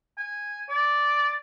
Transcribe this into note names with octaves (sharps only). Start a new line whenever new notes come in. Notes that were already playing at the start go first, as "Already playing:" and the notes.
G#5
D5